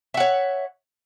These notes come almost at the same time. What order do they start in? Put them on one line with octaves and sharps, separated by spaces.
E5 F#5 C#5